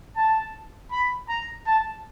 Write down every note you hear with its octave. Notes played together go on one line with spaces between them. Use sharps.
A5
B5
A#5
A5